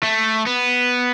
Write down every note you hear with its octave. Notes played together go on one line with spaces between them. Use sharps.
A3
B3